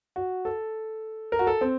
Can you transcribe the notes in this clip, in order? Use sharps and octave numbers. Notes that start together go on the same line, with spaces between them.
F#4
A4
A#4
F#4
A4
C4